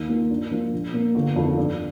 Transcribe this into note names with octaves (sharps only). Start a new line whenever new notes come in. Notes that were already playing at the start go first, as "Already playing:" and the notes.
Already playing: D#2
D#3 A#3 F4
G2
F3 A#3 F4
A#1
A#2 A#3
G1
F2 D#3
G2